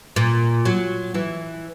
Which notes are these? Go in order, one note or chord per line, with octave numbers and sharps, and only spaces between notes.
A#2
F#3
E3